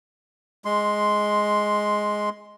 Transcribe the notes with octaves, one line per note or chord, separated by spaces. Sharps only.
G#3 C6